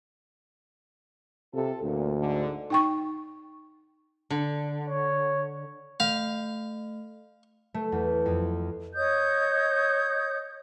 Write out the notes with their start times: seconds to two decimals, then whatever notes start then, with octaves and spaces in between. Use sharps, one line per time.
1.54 C3 F4 A4
1.83 D2 A#2
2.18 G#2 D3
2.70 D#4 G5 C#6
4.30 D3
4.88 C#5
6.00 A3 F5
7.74 A3
7.92 E2
8.26 F2
8.95 C#5 D#5 D#6 G6